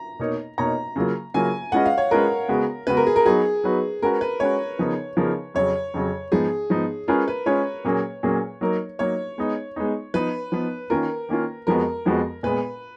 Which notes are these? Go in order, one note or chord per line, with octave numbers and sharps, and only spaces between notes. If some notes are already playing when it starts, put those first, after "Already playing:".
Already playing: A#5
B2 A#3 D#4 A#4 C#5
B2 A#3 D#4 A#4 C#5 A#5
C#3 F#3 A#3 F4
C#3 F#3 A#3 F4 G#5
G#3 C#4 F4 B4 D#5 F#5
F5
C#5
G#3 C#4 F4 A#4 B4 D#5
C#3 G#3 B3 F#4
C#3 G#3 B3 F#4 B4
A#4
G#4
A#4
F#3 B3 D#4 F#4 G#4 B4
F#3 B3 D#4 F#4 B4
G#3 C#4 F#4 A#4 B4
B4
G#3 C#4 F#4 B4 C#5
C#3 F3 B3 D#4 A#4
C#3 F3 B3 D#4 A#4
F2 C#3 F#3 C#5
F2 C#3 F#3
G#2 F3 B3 D#4 G#4
G#2 F3 B3 D#4
G#3 C#4 F4 G#4 A#4 B4
B4
G#3 C#4 F4 G#4 B4 C#5
A#2 F#3 A#3 C#4 G#4
A#2 F#3 A#3 C#4 G#4
F#3 A#3 D#4 A#4
F#3 A#3 D#4 A#4 C#5
G#3 B3 D#4
G#3 B3 D#4
F3 B3 D#4 B4
F3 B3 D#4
D#3 A#3 C#4 F4 A#4
D#3 A#3 C#4 F4
F2 F3 G#3 B3 F#4 A#4
F2 F3 G#3 B3 F#4
A#2 G#3 B3 B4